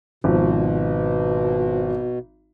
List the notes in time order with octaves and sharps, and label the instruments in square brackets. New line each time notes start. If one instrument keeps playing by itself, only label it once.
[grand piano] G#1 F3 [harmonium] B2